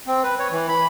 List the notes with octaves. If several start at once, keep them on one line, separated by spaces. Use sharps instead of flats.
C4
B4
C#5
E3
B5